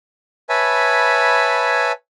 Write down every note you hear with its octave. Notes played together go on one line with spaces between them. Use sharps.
B4 C#5 E5 G#5 A5 B5